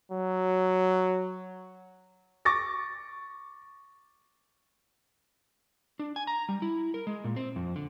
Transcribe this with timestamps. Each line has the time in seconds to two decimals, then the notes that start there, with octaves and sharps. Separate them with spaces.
0.12 F#3
2.45 C#6 D6 A6 A#6
5.99 D4
6.16 G#5
6.27 A#5
6.49 G3
6.62 E4
6.94 A#4
7.07 G#3
7.24 A#2
7.36 C4
7.56 F2
7.76 D3